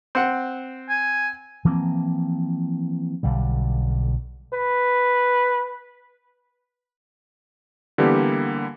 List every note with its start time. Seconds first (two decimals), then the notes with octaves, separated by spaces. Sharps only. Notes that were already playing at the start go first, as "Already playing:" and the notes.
0.15 C4 F#5
0.89 G#5
1.65 E3 F3 A#3 C4
3.23 B1 D3 G3
4.53 B4
7.98 D3 E3 G3 A#3 B3 G4